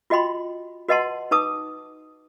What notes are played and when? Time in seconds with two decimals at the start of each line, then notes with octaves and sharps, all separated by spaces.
0.10 F4 F#4 D#5 G5 B5 C6
0.89 F#4 B4 D#5 F#5 A5 C6
1.31 D#4 B4 A5 D6 D#6